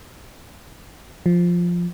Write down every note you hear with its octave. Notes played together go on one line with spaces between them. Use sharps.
F3